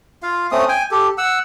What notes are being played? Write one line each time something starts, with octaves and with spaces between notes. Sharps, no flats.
F4 F5
A3 C4 C#4 D#6
G5 G#5
G4 A4
F#5 E6